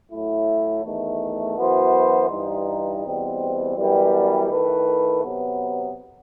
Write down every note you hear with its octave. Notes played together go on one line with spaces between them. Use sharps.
A2 F#3 A3 E4
E2 D#3 A3
F#2 E3 B3 F#4 C5
G2 E3 G3 D#4
E2 B2 G3 C4
F#2 E3 G3 B3
D#3 A3 E4 B4
C3 F#3 B3